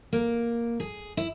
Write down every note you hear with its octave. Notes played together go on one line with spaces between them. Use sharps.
A#3
G#4
E4